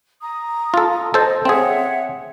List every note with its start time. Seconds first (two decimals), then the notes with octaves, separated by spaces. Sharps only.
0.21 A#5 D#6
0.74 F4 A4
1.14 A4 C5 D#5
1.45 C4 G#4 C#5 E5 F#5